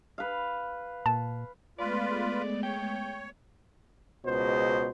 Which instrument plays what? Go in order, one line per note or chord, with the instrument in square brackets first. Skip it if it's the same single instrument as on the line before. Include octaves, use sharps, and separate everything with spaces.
[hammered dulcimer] B4 F5
[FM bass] A#2 [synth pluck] A5
[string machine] G#3 A3 B3 [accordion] F4 B4 [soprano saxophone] D5
[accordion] C#5 [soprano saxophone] G5
[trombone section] C#2 B2 G#3 C5